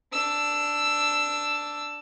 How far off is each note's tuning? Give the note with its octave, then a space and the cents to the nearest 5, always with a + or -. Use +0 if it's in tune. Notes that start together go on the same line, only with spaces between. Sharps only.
D4 +0 E6 +10